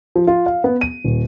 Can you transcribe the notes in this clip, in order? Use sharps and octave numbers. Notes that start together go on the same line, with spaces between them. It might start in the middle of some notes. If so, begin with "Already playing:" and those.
F3
F4
F5
B3
D#7
D#1